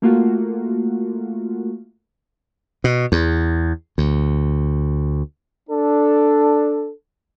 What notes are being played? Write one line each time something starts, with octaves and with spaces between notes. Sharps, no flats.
A3 A#3 F4 F#4
B2
E2
D2
D4 A4